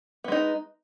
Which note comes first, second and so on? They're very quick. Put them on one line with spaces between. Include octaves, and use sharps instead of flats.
B3 G#3 D#4